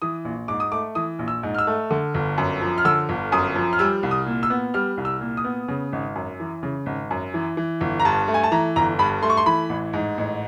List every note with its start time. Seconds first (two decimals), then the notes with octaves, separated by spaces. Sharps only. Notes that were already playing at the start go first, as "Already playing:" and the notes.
0.02 E3 D#6
0.25 A#1
0.48 G#2 D6
0.60 D#6
0.72 A3 D6
0.95 E3 D#6
1.19 A#1
1.28 E6
1.43 G#2
1.55 F6
1.59 E6
1.67 A3
1.91 D3
2.14 G1
2.38 F#2
2.61 F3
2.78 F6
2.85 D3 E6
3.09 G1
3.32 F#2 D#6
3.55 F3
3.73 F6
3.79 G3 E6
4.03 C2
4.11 D#6
4.26 A#2
4.43 E6
4.50 B3
4.74 G3 F6
4.97 C2
5.05 E6
5.21 A#2
5.37 D#6
5.44 B3
5.68 C#3
5.93 G#1
6.16 F#2
6.40 E3
6.63 C#3
6.86 G#1
7.11 F#2
7.34 E3
7.57 E3
7.81 G1
8.00 A#5
8.05 G2 A5
8.28 A3
8.34 G#5
8.43 A5
8.52 E3 A#5
8.76 G1 A#5
8.99 G2 B5
9.22 A3 C6
9.30 C#6
9.37 C6
9.46 E3 B5
9.69 A1
9.93 G#2
10.18 A1